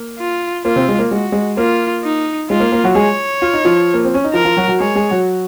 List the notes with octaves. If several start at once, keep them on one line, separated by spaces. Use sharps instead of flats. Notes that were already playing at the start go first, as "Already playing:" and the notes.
Already playing: A#3
F4
A#3 F4
C3 C4
G#3
A#3
G#3 F#4
G#3
A#3 F4
D#4
G#3 F4
A#3
A#3
F#3 F#4
G#3 G#4 C#5
F4
D#4
F3 F4
A#3
C4
C#4
D#4
F3 F4 A#4
F3 F4
F#3 F#4
F#3 F#4
G#3 G#4 C#5
G#3 G#4
F#3 F#4